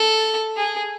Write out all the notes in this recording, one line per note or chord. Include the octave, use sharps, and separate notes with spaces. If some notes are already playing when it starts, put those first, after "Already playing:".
Already playing: A4
G#4